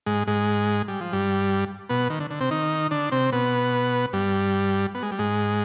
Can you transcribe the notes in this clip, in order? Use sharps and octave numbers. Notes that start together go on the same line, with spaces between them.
G#2 G#3
G#2 G#3
G3
F3
G2 G3
B2 B3
D#3
D3
D3
C3 C4
D#3 D#4
D3 D4
C3 C4
B2 B3
G2 G3
B3
G#3
G3
G#2 G#3